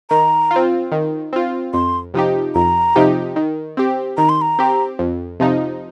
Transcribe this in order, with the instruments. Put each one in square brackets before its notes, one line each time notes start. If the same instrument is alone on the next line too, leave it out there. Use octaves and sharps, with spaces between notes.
[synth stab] D#3 [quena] A#5
[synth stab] F4
C4
D#3
C4 F4
[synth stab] F2 [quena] C6
[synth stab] C3 F3 D#4 G4
[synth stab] F2 [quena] A#5
[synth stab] C3 F3 D#4 G4
D#3
C4 G4
[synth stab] D#3 [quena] A#5
[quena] C6
A#5
[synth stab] C4 G4
F2
C3 F3 D#4